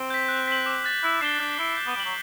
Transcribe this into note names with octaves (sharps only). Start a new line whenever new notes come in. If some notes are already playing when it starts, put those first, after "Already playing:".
Already playing: C4
G6 B6
F#6
B6 F#7
D6
F#6 A6
E4 F#6
D4 C7 E7 G7
D4 F#6
E4 B6 D7 G7
G6
B3
G3 D7 F#7
F#3